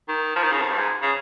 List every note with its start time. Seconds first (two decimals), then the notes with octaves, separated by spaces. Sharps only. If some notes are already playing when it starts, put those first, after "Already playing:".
0.08 D#3
0.36 F3
0.43 D#3
0.52 C#3
0.61 F2
0.69 G2
0.78 G#2
1.02 C#3